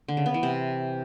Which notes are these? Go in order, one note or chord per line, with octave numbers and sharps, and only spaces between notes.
D3
C#3
B3
E3
C3